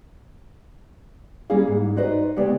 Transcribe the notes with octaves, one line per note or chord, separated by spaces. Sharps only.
G3 A#3 C#4 E4 G#4 F5
G#2
D#4 F#4 B4 C5 D5 D#5
D2 C#3 G#3 B3 G4 D5